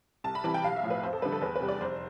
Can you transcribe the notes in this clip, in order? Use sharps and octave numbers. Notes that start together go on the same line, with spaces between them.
C2 A5
B5
C3 E3 G3 A5
G5
B1 F5
E5
A2 F3
B4
F2 C5
A4
D3 G3 B4
A4
E2 B4
B4
C3 G3
D5
F1 C5